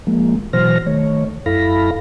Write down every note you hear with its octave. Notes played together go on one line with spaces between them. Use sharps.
F3 G#3 A#3
B2 E3 F#3 C5 F6 A#6
D#3 A3 C#5
F#2 E4 A4 F5 B5 A#6